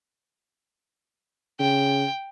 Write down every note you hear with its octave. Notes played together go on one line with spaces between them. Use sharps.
C#3 G5